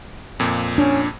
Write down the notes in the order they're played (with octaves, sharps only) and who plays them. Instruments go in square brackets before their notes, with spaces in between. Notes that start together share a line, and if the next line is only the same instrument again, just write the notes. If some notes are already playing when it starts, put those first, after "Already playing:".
[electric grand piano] F2 A#2
[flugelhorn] C#4 [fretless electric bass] D4